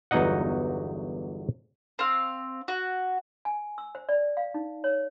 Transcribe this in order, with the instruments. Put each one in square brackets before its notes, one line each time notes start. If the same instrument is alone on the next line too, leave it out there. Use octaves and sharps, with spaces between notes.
[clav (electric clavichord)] G1 E2 F#3 D#4 D#5 F#5
[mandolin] C4 F5
F#4
[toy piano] G#5
E6
C5
D5
F5
D#4
C#5